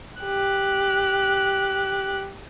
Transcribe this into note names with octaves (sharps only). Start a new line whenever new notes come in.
G4 F#6